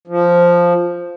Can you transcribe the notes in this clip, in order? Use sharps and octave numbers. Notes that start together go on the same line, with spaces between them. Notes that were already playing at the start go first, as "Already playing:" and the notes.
F3